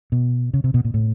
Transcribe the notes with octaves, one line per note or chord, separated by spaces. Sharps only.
B2
C#3
C3
B2
A#2
A2